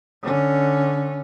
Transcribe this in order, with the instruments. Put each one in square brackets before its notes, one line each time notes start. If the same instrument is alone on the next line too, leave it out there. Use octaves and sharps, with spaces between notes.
[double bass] D3 C#4